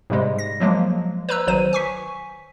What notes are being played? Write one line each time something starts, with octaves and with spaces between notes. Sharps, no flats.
G#2 C3 G3 G#3
A#6
F3 F#3 G#3 A#3
B4 C5 A#5 E6 F#6
G#1 F#3 C5 D#7
G#5 C#6 B6